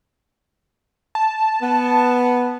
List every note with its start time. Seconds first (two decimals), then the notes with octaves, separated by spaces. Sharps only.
1.15 A5
1.62 B3